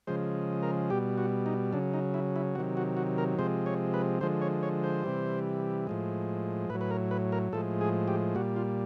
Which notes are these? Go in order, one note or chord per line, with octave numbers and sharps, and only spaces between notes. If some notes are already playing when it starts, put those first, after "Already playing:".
C#3 F3 G#3 C5
A#4
B2 G3 G4
F#4
D#4
C#3 F#3 D4
D#4
E4
E4
C3 D#3 F#3 F#4
F#4
F#4
A#4
C3 F3 G#3 C5
C#5
B4
D3 F3 G#3 C5
C#5
C#5
C5
C3 E3 G3
A2 F3 G#3
A2 F#3 B4
B4
A#4
B4
A#4
A2 F3 G#3 A4
G#4
G4
A#2 G3 F#4
F4